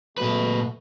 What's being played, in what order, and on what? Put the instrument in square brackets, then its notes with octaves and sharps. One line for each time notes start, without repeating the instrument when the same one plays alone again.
[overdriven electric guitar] A#2 B4 [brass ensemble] F#3 G#3 A3